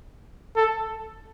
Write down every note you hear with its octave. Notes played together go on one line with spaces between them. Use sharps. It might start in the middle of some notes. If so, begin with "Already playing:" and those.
A4